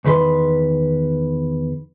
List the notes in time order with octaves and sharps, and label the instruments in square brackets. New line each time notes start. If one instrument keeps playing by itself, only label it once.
[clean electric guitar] E2 D#3 B4 C5 C6